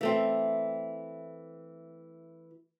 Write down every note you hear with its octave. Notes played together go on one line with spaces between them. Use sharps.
E3 A3 C4